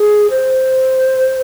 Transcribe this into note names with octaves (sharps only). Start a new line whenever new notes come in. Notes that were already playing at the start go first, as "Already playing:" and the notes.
Already playing: G#4
C5